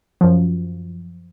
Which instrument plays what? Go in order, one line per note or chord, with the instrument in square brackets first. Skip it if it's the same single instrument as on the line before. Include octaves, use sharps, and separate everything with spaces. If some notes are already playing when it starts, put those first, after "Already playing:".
[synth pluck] F#2 F3